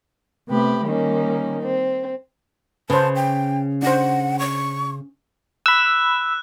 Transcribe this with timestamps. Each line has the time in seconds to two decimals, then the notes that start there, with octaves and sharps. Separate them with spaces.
0.47 C3 A3 B3 G4 B5
0.85 D#3 G3 A#3 C#4 D#4
1.62 C4
2.90 C#3 B4 C5 A5
3.16 G5
3.83 D4 C5 F#5
4.39 C#6
5.66 B5 E6 F#6